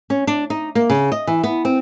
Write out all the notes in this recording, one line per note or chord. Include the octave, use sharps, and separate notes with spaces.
C#4
D4
D#4
A#3
C#3
D#5
E3
B3
C4